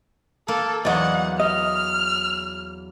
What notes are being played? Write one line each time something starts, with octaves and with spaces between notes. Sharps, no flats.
A#3 A4
E2 F#3 D5 D#5 F#5
D#5 F6